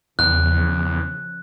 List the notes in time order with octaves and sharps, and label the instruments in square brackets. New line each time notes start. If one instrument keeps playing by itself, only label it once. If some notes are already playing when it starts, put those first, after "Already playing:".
[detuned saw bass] E2 [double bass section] C#3 F3 [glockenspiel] F#6